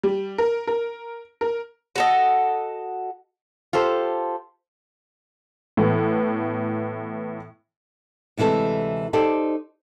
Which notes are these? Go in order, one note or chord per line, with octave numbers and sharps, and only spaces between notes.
G3
A#4
A#4
A#4
F#4 A4 D#5
F4 G4 A4 C5
A2 E3 B3
D2 C3 E3 G#3 A4
D#4 G4 A4 C5 D5